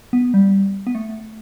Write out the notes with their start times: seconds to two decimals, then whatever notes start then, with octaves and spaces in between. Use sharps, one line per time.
0.13 B3
0.34 G3
0.87 B3
0.95 A3